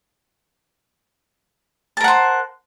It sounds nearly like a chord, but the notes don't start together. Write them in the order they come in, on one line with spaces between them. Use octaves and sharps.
A5 A#4 F#5 C5